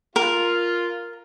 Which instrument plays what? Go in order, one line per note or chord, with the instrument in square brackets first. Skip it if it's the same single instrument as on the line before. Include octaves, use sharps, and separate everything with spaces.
[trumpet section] F4 [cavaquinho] A#4